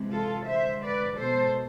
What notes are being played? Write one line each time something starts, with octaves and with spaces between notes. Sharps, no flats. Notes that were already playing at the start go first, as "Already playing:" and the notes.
Already playing: C3 E3 G#3
F4 A4
D3 G#3 C5 E5
B4 D5
B2 G#3 A4 C5